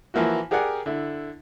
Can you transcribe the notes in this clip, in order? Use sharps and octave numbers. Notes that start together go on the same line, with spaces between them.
E3 F3 A#3 E4 F#4
G4 G#4 A#4 D5 F#5 G#5
D3 E4